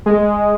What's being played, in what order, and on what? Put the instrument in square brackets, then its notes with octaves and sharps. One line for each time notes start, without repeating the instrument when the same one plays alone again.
[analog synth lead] G#3